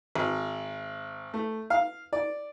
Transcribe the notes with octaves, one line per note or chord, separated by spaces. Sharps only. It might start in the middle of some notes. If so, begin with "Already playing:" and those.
G#1
A3
F5
D5